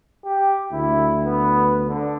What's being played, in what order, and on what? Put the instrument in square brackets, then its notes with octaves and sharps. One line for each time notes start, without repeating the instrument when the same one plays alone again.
[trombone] G4
[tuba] D2 [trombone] E4
[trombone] B3
D3